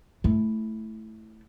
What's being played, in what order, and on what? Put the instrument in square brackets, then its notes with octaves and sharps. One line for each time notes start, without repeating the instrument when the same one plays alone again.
[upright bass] A3 E4